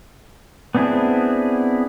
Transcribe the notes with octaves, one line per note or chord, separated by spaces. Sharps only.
B3 C4 D4 E4 G#4